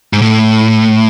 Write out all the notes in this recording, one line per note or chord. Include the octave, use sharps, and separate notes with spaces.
G#2
A2